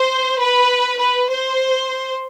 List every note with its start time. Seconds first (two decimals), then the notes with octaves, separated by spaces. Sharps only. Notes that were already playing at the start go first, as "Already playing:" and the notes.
Already playing: C5
0.41 B4
0.99 B4
1.30 C5